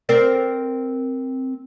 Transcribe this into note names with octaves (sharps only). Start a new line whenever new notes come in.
C4 A#4 D5